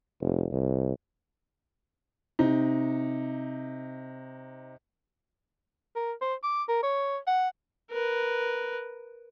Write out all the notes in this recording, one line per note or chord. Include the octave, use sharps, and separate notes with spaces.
F1
C2
C3 D#4
A#4
C5
D6
A#4
C#5
F#5
A#4 B4